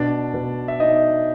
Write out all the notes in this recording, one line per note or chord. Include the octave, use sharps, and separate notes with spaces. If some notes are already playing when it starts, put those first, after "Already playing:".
Already playing: B2 D4 D5
B2
E5
B3 D#4 D#5